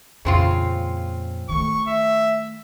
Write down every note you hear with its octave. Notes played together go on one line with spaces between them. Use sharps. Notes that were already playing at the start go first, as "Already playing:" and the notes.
F2 A#2 C#3 C4 F4
D#3 A3 C#6
E5